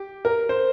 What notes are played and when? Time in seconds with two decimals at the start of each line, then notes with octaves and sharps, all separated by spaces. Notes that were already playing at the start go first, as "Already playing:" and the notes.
Already playing: G4
0.25 A#4
0.49 C5